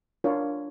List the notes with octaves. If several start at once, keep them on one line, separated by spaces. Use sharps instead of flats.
D4 F4 A#4 C#5